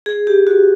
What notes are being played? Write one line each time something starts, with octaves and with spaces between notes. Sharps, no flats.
G#4
G4
F#4